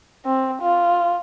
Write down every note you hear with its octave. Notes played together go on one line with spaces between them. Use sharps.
C4
F4